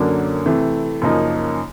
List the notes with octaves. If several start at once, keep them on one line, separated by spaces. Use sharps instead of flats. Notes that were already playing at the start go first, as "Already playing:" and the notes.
Already playing: F#2 D3 F#3 A#3 D4
C3 E3 A3
F#2 C#3 F3 A#3 D#4